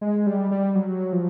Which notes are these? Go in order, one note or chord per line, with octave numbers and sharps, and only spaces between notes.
G#3
G3
G3
F#3
F3